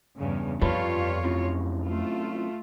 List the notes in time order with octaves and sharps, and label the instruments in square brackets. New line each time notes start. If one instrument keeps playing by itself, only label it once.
[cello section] E2 G2 C#3
[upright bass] F2 [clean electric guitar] G3 A4 B4 [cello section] F4 C#5
[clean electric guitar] F#2 A2 C3
[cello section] A3 F4